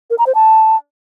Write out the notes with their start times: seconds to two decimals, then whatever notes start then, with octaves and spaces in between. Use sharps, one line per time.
0.10 A#4
0.18 A#5
0.27 C5
0.35 A5